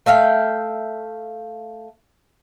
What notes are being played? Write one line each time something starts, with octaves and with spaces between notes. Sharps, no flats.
A3 E5 F5 G5